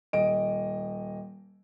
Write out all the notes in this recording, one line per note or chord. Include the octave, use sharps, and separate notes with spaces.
D#1 D#5 D7